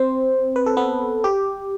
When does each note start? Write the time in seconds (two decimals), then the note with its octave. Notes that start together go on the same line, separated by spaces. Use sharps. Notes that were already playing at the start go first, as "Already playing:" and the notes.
Already playing: C4 C5
0.56 B4
0.66 A4
0.77 B3 B4
1.24 G4